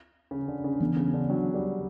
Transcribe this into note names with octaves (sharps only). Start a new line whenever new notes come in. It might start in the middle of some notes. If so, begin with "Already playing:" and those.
C#3
D3
C#3
E3 B3 D4
C#3
D3
F#3
G3